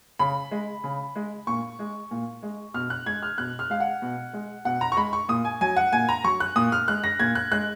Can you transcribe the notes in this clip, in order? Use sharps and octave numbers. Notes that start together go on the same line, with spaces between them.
C#3 B5
G#3
C#3
G#3
A#2 C#6
G#3
A#2
G#3
B2 F6
F#6
G#3 G#6
F6
B2 F#6
F6
G#3 F5
F#5
B2
G#3
B2 F#5
A#5
C#6
G#3 B5
C#6
A#2 D#6
G#5
F#3 G#5
F#5
A#2 G#5
A#5
F#3 C#6
F#6
A#2 D#6
F6
G#3 F#6
A#6
A#2 G#6
F#6
G#3 F#6